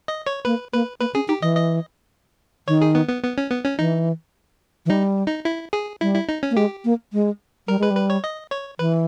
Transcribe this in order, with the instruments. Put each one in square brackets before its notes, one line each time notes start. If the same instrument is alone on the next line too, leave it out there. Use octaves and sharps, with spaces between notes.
[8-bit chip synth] D#5
C#5
[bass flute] A#3 [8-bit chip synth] B4
[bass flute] A#3 [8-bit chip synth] B4
[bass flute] A#3 [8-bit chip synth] B4
[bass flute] C#4 [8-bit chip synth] G#4
[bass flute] D#4 [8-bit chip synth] G4
[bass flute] E3 [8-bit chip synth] D#5
[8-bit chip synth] D#5
[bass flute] D#3 [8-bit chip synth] C#5
[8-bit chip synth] G#4
B3
B3
B3
C#4
B3
C#4
[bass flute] E3 [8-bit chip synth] D#4
[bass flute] E3
[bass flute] G3 [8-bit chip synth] D#4
[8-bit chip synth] D#4
E4
G#4
[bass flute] G3 [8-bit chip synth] E4
[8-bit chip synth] E4
D#4
C#4
[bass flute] A#3
[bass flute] G#3 [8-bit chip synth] G4
[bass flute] A#3
G#3
[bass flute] G3 [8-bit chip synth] A#4
[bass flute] G#3 [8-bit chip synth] B4
[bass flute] G3
[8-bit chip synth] B4
C#5
D#5
C#5
[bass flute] E3 [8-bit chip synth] B4